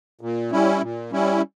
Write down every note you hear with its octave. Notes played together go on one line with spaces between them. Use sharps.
A#2
G3 C#4 E4
A#2
G3 C#4 E4